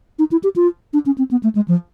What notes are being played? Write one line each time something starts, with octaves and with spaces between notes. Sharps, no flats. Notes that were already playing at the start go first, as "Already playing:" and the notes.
D#4
E4
G4
F4
D4
C#4
C4
B3
A3
G#3
F3